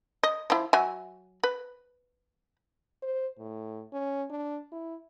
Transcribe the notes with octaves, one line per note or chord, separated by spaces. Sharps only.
D#5
F3 E4
F#3 E5 G#5
B4
C5
A2
C#4
D4
E4